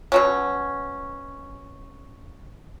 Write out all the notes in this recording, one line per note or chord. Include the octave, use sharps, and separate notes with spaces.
B2 F#3 C#4